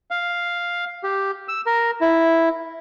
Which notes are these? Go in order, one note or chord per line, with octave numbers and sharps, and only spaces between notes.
F5
G4
E6
A#4
E4